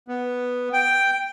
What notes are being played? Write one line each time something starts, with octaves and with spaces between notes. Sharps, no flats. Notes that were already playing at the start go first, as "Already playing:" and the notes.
B3
G5